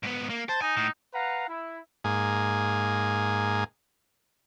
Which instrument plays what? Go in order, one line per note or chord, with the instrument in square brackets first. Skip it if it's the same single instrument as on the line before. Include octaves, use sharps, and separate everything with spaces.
[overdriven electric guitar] G#2 B3
A#3
[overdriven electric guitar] C5 [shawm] A5
[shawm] D#4 [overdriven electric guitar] G#5
[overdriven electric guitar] A2
[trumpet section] B4 F5 F#5 A#5
E4
[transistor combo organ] G#2 A#3 G#4 G#5